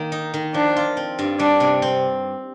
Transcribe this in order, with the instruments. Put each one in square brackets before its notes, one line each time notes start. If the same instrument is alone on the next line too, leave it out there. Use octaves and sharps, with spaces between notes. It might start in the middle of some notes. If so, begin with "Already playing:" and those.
Already playing: [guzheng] D#3 A#3
D#4
D#3
[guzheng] F3 [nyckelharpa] D4
[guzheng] F4
C4
G2
[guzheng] G3 [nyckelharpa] D4
[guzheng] C3
C4